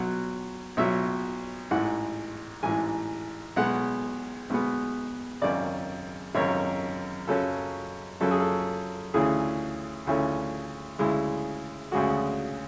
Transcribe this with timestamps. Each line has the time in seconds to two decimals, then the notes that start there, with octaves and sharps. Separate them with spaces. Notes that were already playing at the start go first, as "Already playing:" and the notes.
Already playing: B1 B2 F#3 F#5
0.77 B1 B2 F#3 E5
1.71 A1 G#2 E3 F#5
2.63 A1 G#2 E3 G#5
3.56 B1 B2 G#3 B3 F#5
4.50 B1 B2 G#3 B3
5.42 G#1 F#2 C#3 D5
6.35 G#1 F#2 C#3 C#5
7.27 F#2 C#3 F#3 C#4 A4
8.21 F#2 C#3 F#3 C#4 A4
8.31 G#4
8.40 A4
9.14 D2 C#3 E3 A3 C#4 G#4
10.07 D2 C#3 E3 A3 C#4
10.99 D2 C#3 G#3 E4
11.92 D2 C#3 G#3 F#4